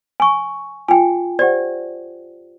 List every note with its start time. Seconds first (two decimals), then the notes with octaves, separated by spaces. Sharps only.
0.20 G#5 C#6
0.88 F4 G5 G#5
1.39 G4 C5 D5 F#5